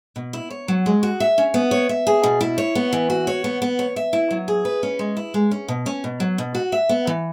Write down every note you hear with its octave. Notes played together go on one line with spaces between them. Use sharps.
B2
E4
C#5
F#3
G#3
F#4
E5
C#4
B3
C#5
E5
G#4
B2
E4
C#5
B3
E3
F#4
C#5
B3
B3
C#5
E5
E4
F#3
G#4
B4
C#4
G#3
E4
G#3
C#4
B2
C#4
B2
F#3
B2
F#4
E5
B3
E3